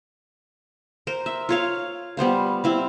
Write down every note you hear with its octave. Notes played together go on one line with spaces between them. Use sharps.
A#4 C5
E5
F4 C#5 F5
G3 B3 C5 F5
C4 E4 F5